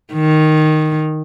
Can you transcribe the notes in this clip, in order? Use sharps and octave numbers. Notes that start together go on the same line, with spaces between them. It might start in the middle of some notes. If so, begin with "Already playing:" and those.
D#3